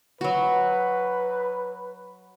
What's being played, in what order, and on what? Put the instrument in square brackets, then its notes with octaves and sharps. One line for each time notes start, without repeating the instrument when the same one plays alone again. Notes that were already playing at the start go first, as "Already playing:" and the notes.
[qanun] F#3 F#4 [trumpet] B4